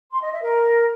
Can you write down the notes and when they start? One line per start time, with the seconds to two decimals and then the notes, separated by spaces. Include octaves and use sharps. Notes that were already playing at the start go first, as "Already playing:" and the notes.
0.12 C6
0.22 D#5
0.32 E5
0.42 A#4